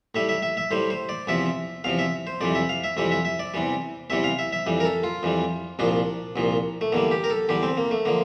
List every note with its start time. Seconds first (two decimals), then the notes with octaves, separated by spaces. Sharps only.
0.15 A2 G3 E5
0.29 E5
0.43 E5
0.57 E5
0.71 A2 G3 C5
0.90 C5
1.09 D5
1.27 E2 C3 F3 E5
1.84 E2 C3 F3 F5
1.99 E5
2.27 C5
2.41 F2 C3 E3 G3 D5
2.55 E5
2.69 F5
2.84 E5
2.97 F2 C3 E3 G3 E5
3.11 E5
3.25 E5
3.40 D5
3.54 E2 C3 E3 G3
4.10 E2 C3 E3 G3 E5
4.24 F5
4.39 E5
4.53 E5
4.66 F2 E3 G3
4.80 A#4
4.85 A4
5.04 F4
5.23 F2 E3 G3
5.79 C2 A#2 F3 D4
6.36 C2 A#2 F3
6.81 A3
6.92 E2 D3 G3 A#3
7.11 G4
7.24 A#4
7.30 A4
7.49 E2 D3 G3 G4
7.63 C4
7.77 A#3
7.91 A3
8.05 D3 F3 A#3